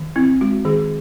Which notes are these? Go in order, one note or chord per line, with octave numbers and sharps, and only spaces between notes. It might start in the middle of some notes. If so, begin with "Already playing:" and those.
Already playing: D#3
C4 E4
G#3 F#4
D#3 G#4